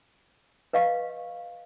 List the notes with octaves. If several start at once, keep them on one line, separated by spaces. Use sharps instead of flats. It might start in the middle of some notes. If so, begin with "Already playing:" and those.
B4 D#5 F5 C#6